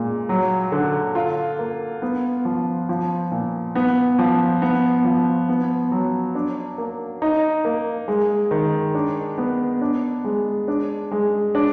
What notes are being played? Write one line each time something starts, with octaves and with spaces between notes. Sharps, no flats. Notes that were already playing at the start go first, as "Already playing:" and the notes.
Already playing: A#2 G#3
F#3
D3
F4
A#3
B3
F3
F3
A#2
B3
F3
B3
F3
B3
F#3
D4
A#3
D#4
A#3
G#3
D#3
D4
B3
D4
G#3
D4
G#3
D4